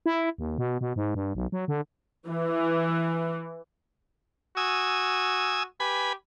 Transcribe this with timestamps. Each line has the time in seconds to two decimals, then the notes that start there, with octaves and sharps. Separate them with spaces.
0.06 E4
0.38 D#2
0.58 B2
0.81 B2
0.96 G#2
1.15 G2
1.35 B1
1.52 F#3
1.68 D3
2.28 E3
4.57 F#4 G#5 D#6 E6
5.80 G4 B4 G#5 B5